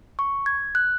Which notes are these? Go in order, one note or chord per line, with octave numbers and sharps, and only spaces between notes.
C#6
G#6
F#6